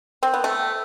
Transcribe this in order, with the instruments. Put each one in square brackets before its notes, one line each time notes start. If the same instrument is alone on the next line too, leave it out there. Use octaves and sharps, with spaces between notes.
[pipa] C4
B3
A3